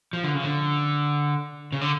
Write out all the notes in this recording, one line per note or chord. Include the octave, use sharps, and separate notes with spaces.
F3
D3
C#3
D3
C#3
D3